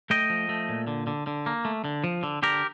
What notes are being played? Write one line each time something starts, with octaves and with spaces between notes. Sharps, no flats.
A3 D#5 G5
F3
A3
A#2
D3
D3
D3
A#3
A3
D3
F3
D3
D3 G4 A#4